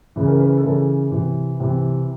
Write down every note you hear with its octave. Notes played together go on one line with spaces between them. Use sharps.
C#3 E3
A#4
B4
A4
C#3 E3 A#4
C3 E3
C3 E3